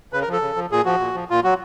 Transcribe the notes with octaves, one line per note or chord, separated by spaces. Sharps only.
C#3 B4
A#4
F3
A4
C#3
F3
A#2 G#4
F3 F#4
A#2
F3
A#2 F4
F#3 F#4